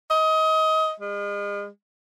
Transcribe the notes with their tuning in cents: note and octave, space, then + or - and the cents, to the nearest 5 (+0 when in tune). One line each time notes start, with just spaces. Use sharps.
D#5 +25
G#3 -40